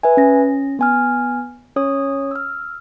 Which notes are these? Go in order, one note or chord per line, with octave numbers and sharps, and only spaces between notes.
B4 E5 G#5
C#4 A#6
B3 G#5 F6
C#4 C#5 D#6
E6 F6